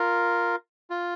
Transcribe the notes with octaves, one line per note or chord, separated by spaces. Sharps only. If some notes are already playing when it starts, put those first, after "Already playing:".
Already playing: F4 A#4
F4